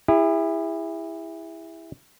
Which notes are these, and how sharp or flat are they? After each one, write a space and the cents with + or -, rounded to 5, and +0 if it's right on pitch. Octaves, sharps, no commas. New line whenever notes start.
E4 +0 G#4 -45